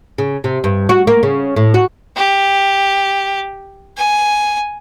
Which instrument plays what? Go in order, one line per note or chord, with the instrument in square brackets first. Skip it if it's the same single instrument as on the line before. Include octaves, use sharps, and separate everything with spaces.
[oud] C#3
C3
G2
F#4
A#3
C#3
A2
F#4
[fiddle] G4
G#5